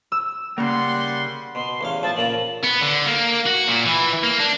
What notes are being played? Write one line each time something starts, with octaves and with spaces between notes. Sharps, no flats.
E6
C#3 G3 A#3 F#5 C6
B2 C6
A1 E2 F5
F3 C4 A5
A#2 C#3 A#5 F#7
B3
D3
A#3
F#4
A#2
E3
A#3
D4